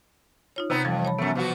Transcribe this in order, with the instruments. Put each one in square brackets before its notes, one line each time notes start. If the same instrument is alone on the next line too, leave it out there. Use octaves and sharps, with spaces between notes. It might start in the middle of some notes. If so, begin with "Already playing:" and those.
[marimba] D#4 F4 C#5
[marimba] C3 [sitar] B3 C4 D#4
[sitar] F2 [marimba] E3 F3 G3
[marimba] C#5 A5 B5
[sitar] F#2 A3 [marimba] B3
[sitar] B2 F3 F#4